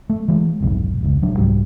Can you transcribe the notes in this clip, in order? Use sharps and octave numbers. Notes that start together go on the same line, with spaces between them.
A3
E3 G#3
F1 B1 G#2
E1 C#2
D#1 F#3 D4
C2 G#2 G3